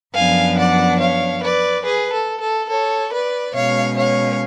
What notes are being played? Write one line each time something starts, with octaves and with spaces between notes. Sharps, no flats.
F#2 F3 B3 D4 F5 G#5
D5 F#5
C#5 F5
B4 D5
G#4 B4
A4
A4
A4 C#5
B4 D5
B2 G#3 C#4 C#5 F5
C#5 F5